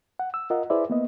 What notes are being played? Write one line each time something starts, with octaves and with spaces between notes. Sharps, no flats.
F#5
E6
F4 A#4 D#5 F#5
E4 G#4 B4 C5 D5 E5
A#3 B3 D#5